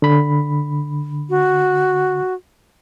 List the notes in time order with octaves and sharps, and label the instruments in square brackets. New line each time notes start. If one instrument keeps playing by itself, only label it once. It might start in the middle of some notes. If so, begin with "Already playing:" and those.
[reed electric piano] D3 B5
[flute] F#4